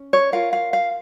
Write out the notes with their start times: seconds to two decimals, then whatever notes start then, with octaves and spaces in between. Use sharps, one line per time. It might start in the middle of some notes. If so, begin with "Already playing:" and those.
Already playing: C#4
0.13 C#5
0.32 F4 A#4 F5
0.53 F5
0.73 F5